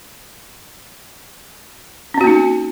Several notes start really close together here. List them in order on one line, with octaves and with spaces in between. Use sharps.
C#4 C4 F#4 A#3 D#4